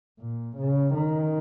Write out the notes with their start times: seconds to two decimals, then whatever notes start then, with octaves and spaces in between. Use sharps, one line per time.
0.19 A#2
0.57 C#3
0.94 D#3